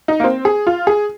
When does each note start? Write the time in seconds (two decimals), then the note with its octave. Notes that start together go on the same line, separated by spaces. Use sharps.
0.08 D#4
0.20 A#3
0.24 C4
0.45 G#4
0.67 F4
0.87 G#4